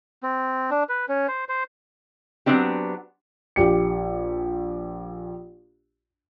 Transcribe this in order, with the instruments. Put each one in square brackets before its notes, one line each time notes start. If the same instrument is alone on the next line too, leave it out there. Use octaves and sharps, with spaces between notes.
[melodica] C4
D4
B4
C#4
C5
C5
[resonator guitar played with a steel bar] F#3 G#3 B3 C4 D4 G4
[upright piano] A#1 G4 C#7